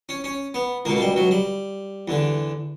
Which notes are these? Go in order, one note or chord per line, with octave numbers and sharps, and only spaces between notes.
C#4
C#4
B3
C#2 B2 A#3
A#3
G3
F#3
G3
E2 D3